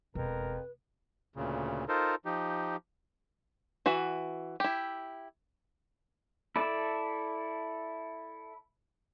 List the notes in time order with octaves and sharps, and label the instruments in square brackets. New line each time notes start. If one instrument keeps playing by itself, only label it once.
[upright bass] E1 [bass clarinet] F2 [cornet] A#4 [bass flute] B4
[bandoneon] D2 A#2 C#3
D#4 F4 A4 A#4 C5
F3 D#4 G4
[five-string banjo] E3 F#4 E5
E4 G4
[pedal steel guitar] E4 A4 D5 E5 A5